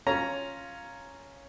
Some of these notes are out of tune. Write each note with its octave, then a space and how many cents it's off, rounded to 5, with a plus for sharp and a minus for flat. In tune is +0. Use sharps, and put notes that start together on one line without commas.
C#4 +0 F4 +0 A#5 +0